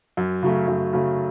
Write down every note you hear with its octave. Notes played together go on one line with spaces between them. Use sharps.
F#2
C#3 F#3 A3
F#2
C#3 F#3 A3